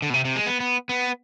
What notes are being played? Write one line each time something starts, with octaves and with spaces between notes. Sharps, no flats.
D3
B2
C3
C3
G#3
B3
B3
B3